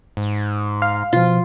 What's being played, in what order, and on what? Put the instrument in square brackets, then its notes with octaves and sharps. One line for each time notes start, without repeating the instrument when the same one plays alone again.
[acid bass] G#2
[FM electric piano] F5
[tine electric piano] B2 F3 [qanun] F4